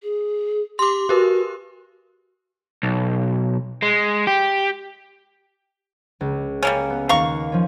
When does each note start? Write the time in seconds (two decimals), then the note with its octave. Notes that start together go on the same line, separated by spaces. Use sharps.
0.03 G#4
0.79 G4 C6 D6
1.09 F#4 G4 A#4 B4
2.83 B1
3.83 G#3
4.27 G4
6.21 C#2
6.63 G3 A#3 C#4
6.90 B3
7.09 D#2 F5 A#5 C#6 C7
7.52 F3 C#4